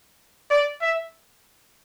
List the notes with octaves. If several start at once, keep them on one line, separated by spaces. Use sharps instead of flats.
D5
E5